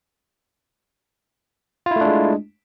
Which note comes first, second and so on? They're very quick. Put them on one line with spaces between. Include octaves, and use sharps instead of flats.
F4 E4 A3 D4 G#3